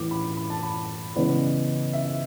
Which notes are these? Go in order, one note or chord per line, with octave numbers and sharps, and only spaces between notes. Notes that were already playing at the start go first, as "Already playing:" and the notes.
Already playing: A2 E3 A3 D6
B5
B5
A5
B5
C#3 E3 G#3 B3 E4 D5
E5